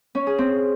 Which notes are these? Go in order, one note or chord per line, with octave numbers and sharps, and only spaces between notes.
C#4
G#4
C4